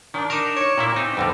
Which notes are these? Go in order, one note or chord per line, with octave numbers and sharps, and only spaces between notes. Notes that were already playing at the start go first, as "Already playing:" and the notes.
D#3 D4
D#4 A#4 D6 D7 E7
C#5 D6 D7 E7
A#2 A#3 E4
C4 D#4 E6
F2 D3 G3 B3